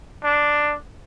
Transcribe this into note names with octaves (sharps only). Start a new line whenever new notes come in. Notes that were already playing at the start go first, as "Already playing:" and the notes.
D4